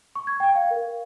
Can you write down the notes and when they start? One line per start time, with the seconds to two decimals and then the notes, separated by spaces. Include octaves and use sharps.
0.16 C#6
0.27 G#6
0.40 G5
0.55 F5
0.71 A#4